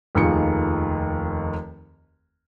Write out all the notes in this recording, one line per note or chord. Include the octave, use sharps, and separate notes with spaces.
F1 D#2 D#3 F4 G#4 C#7